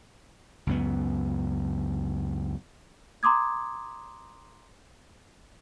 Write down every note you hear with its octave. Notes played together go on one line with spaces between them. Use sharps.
C#2 F#2 B3
A#5 C6 D6 D#6 G#6